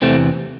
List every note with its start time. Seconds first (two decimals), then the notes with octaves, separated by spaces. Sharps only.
0.02 E2 C3 E3 A3 C4